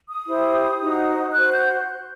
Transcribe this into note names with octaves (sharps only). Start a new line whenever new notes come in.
D#6
E4 G4 C5
D#4 F#4 C5
F#4 C5 F#6
G6